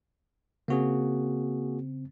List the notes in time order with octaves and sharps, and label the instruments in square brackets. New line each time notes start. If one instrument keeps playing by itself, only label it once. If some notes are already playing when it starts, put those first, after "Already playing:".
[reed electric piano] C#3 C4 [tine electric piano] A#3 F#4 G#4